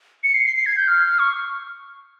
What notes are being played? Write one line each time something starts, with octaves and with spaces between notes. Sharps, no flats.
C#7
C7
C7
C7
G#6
G6
F6
C#6